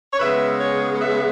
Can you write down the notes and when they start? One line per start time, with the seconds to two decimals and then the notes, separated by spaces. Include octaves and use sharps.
0.13 C#5
0.19 C#3 G#3 B3 B4 E5
0.60 G#4 C#5
1.00 B4 E5